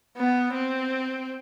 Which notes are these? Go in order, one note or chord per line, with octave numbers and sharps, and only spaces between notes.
B3
C4